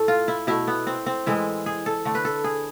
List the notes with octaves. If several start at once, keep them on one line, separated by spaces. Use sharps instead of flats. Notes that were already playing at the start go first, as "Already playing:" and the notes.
Already playing: A2 A3 A4
F4
E4
B2 A3 E4
B3
C4
C4
A2 E3 G#3 E4
G#4
A4
D3 A3
B4
A4
G#4